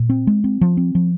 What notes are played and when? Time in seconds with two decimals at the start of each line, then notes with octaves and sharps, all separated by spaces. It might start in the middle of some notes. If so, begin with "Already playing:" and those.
Already playing: A#2
0.10 C4
0.27 G#3
0.44 C4
0.61 F3
0.77 C4
0.95 F3